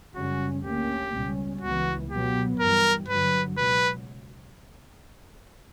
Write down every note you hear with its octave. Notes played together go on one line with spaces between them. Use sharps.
F#2 C#3 G3 C#4 F#4
D2 D3 A#3 C#4 G4
C#2 B2 G3 C#4
C#2 C#3 E3 B3 F#4
B2 F#3 B3 G4
G2 E3 G3 A#4
G2 D3 F#3 B4
C#2 B2 F#3 B4